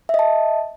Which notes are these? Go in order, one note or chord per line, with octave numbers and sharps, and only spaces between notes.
D#5 E5 A5